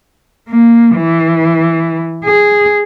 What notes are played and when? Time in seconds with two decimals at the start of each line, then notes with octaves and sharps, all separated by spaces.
0.48 A#3
0.96 E3
2.25 G#4